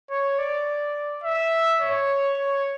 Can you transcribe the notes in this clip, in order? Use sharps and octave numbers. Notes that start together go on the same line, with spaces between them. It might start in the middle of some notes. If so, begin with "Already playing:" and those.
C#5
D5
E5
C#5
C#5